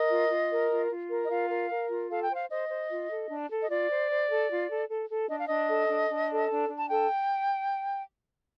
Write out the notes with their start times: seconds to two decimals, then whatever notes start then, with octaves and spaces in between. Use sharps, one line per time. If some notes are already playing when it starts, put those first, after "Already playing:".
Already playing: A#4 D#5
0.10 F4
0.30 F4
0.51 A#4
0.70 F4
0.91 F4
1.10 A#4
1.24 D#5
1.30 F4 F5
1.50 A#4
1.69 A#4
1.89 F4
2.10 A4 F5
2.22 G5
2.30 C5 F5
2.50 C5 D#5
2.69 C5
2.90 F4
3.10 A4
3.29 D4
3.50 A4
3.62 D#5
3.70 F4 D5
3.89 C5
4.10 C5
4.30 A4
4.50 F4
4.70 A4
4.89 A4
5.10 A4
5.30 D4 D#5
5.39 F5
5.47 D4 D#5
5.69 A4
5.89 D4
6.09 D4
6.30 A4
6.50 D4
6.69 D4
6.77 A5
6.89 A4 G5